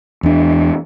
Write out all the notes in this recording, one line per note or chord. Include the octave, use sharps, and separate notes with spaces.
E2 D4